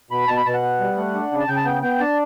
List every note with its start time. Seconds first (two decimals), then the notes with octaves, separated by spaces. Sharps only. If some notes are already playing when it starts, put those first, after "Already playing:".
0.11 B2 B5
0.28 B2 A5
0.37 B5
0.45 B2 A5
0.54 F#5
0.62 B3
0.80 G3
0.97 A3
1.15 D4
1.31 C#3
1.40 A5
1.48 C#3 G5
1.57 A5
1.65 B3 G5
1.82 B3 G5
2.00 D4 A5